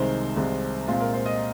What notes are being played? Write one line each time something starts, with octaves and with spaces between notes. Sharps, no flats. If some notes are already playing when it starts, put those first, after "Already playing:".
Already playing: C2 C3 D#3 G#3 C5
C2 C3 D#3 G#3
A#2 G#3 C4 F4
A#4
C5
D#5